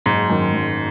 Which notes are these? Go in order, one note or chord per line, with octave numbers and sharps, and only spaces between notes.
F#1 G#2
F#2 D#3
F#1